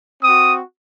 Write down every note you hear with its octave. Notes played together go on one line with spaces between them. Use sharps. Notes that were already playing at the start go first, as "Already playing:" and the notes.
C4 F#4 D#6